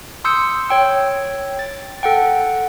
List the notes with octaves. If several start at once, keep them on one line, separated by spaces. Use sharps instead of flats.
C6 D#6 E6 G6 C#7
C#5 G5 E6
A6
A4 F#5 G5